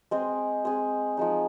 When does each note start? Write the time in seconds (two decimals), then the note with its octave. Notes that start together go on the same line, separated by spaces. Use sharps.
0.11 G#3 C4 G#4
0.65 G#3 C4 G#4
1.17 F3 G#3 D#4